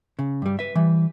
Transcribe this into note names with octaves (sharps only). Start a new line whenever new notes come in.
C#3
G2 G3
B4 E5
E3 G3